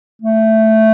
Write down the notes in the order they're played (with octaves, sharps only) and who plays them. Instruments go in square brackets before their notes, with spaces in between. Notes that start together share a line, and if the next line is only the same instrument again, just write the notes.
[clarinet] A3